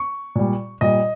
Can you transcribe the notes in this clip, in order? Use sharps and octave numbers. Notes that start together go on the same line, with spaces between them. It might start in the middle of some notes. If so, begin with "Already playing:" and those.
Already playing: C#6
A#2 G3
A#2 G3 D#5